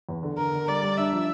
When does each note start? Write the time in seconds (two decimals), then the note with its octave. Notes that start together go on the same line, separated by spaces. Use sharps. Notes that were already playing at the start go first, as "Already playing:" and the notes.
0.09 E2
0.23 D3
0.38 D3 A#4
0.53 D3
0.68 G3 D5
0.82 G3
0.97 D4 E5
1.13 F3